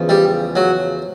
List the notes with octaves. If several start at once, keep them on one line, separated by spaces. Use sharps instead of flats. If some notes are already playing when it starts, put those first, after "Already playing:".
Already playing: E2 C#3 F3
G3
F#3